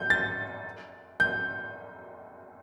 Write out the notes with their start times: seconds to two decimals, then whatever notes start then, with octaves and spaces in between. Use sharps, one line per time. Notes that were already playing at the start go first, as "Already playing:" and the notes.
Already playing: G6
0.10 A6
1.20 G6